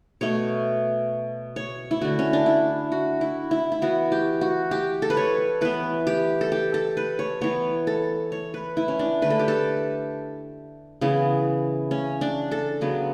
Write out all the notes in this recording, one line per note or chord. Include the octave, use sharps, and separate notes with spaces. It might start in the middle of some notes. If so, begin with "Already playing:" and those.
B2 A3 C#5
C#5
E4
D3 A3 F#4
C#4
D4
E4
F#4
E4
E4
E4
E3 B3 F#4
G4
F#4
G4
A4
B4
C#5
E3 B3 B4
G4
A4
G4
A4
B4
C#5
E3 B3 C#5
A4
C#5
B4
E4
C#4
D4
D3 A3 B4
A4
G4
A4
C#3 E3 B3
C#4
D4
A4
C#3 F#3 B3